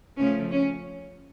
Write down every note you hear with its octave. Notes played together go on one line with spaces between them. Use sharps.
C#3 F3 A3 C#4
C#4